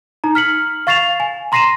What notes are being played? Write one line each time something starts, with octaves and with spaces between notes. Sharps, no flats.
D#4 A#5
F6 B6 C#7 F#7
F5 C#6 A6 C7 E7 F7
G#5
A#5 C6 A#6 C7 D#7 E7